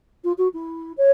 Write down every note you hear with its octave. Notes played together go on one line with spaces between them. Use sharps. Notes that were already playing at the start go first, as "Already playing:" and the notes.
F4
F#4
E4
C#5